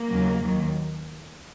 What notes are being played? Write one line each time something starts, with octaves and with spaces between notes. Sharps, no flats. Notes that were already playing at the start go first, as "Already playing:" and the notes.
Already playing: A#3
D#2 C#3 F#3
D#2 D#3 F#3